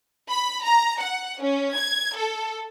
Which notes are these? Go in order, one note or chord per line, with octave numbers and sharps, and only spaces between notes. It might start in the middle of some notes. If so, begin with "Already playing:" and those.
B5
A#5
F#5
C#4
G#6
A4